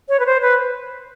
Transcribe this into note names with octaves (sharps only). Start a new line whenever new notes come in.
C#5
B4
C5
B4